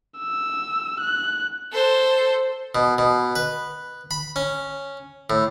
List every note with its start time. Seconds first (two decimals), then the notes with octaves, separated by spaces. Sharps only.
0.19 E6
1.00 F#6
1.73 A4 C5
2.75 B2
2.98 B2
3.36 B4
4.11 B5
4.36 C#4
5.30 A2